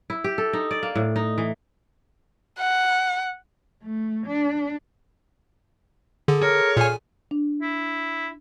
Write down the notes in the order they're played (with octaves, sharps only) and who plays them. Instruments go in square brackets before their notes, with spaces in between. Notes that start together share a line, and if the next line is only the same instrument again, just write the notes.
[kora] E4
G4
A4
D#4
D5
A#3
A2
D#4
E3
[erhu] F#5
[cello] A3
D4
[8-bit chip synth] D3 [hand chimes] G#4 A4
[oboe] A#4 [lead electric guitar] C#5
[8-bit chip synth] A#2 G#5 [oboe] F5
[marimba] D4
[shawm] E4